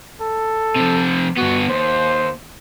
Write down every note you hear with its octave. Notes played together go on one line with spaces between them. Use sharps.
A4
C3 F3
G2 B3 F#4
D#2 C5